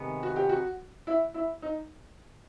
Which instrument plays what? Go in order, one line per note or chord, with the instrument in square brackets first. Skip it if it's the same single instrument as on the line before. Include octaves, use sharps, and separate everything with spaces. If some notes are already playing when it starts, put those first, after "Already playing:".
Already playing: [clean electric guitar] C3 D#3 G#3 B3
[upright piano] F#4
G4
F#4
E4
E4
D#4